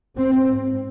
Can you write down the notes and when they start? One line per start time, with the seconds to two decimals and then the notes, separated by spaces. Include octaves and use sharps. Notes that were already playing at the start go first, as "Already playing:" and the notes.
0.17 C4
0.49 G#2